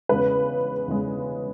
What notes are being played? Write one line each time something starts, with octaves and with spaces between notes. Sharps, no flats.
E2 C#3 G#3 B4
E2 C#3 G#3